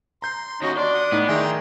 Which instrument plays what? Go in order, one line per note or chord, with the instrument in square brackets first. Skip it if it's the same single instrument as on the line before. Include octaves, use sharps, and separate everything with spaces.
[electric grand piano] A#5 G6 C7 [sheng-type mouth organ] C6
[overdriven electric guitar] D#2 F#4 [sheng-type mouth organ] C#4 D#4 D#5
[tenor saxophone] D4 [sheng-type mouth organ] D5 D6 [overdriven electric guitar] C6
[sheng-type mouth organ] F#5 D#6
[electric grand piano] A2 D#4 [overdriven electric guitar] B3
[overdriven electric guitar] D#3 [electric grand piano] G#4 E5 G#5 [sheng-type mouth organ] G5 A#5 C6